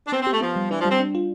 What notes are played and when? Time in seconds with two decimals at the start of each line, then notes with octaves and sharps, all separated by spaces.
0.07 D4
0.12 B3 C4
0.22 C4 G4
0.32 A3
0.41 F3 B3
0.56 G3
0.70 E3 D4
0.80 F3
0.85 G3 C4
1.00 D4
1.15 F4